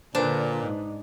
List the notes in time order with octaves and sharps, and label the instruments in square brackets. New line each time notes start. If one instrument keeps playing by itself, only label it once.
[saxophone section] A#2 [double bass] D3 [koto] D4 [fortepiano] B4 C5
[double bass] G#2 D#4